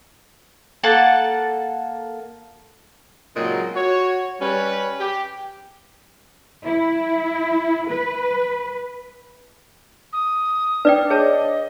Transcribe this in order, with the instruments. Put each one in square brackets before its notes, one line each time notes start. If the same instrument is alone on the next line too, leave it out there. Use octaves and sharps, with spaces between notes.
[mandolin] A#3 A4 F#5 A5
[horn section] A#2 C#3 F#3 G#3 C4 D#4
F#4 C#5
G3 C#4 B4
G4
[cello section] E4
B4
[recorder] D#6
[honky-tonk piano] D4 [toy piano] B4 D5 G5
[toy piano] G#4 C#5 A5 [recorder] D#5